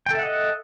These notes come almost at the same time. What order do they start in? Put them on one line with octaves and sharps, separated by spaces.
G5 A4 E5 F#5 D#5